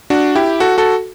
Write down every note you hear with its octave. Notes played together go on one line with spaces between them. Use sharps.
D4 F#4
E4 G4
F#4 A4
F#4 A4